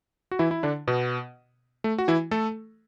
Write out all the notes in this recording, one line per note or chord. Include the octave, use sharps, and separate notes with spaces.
F#4
E3 E4
E4
D3 D4
B2 B3
A3
F#4
E3 E4
A3 A4